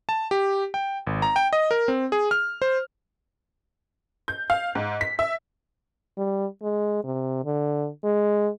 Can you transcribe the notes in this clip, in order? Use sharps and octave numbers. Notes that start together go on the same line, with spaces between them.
A5
G4
G5
G#1
A#5
G5
D#5
A#4
C4
G#4
F6
C5
G6
F5
G#2
B6
E5
G3
G#3
C3
D3
G#3